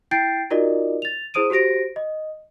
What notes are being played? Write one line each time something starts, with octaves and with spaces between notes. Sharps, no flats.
E4 G5 G6 A6 C7 D7
D#4 F4 F#4 A#4 D5 D#5
A6 F7
E4 G#4 C5 D#6 D7 D#7
F#4 G4 C5 A#6 D7
D#5